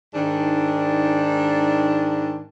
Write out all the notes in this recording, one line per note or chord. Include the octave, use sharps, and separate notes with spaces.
G#2 D#3 D4